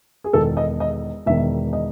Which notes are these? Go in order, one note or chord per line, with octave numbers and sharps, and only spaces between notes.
G#4
E1 E2 D#3 A4
D#5
D#5
E1 E2 D#3 E5
D#5